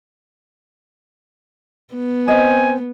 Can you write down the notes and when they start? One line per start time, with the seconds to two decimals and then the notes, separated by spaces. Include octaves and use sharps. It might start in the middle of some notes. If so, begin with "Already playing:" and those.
1.94 B3
2.28 C4 D#5 G#5